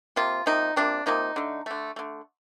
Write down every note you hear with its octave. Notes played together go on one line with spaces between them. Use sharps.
C3 F3 A#3 F4
C3 F3 A#3 D#4
C3 F3 A#3 D4
C3 F3 A#3 D#4
D3 A3
D3 A3
D3 A3